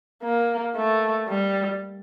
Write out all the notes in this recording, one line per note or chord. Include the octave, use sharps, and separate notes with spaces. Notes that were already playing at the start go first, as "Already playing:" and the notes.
A#3
A3
G3